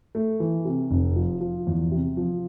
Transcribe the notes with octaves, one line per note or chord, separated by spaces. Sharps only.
A3
E3
C3
F1
F3
F3
E2
C3
F3